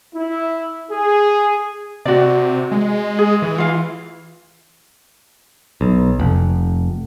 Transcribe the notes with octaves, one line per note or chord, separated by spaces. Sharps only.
E4
G#4
C3 F#4 D5
G#3
G#4
E3
F4 F5
B1
F1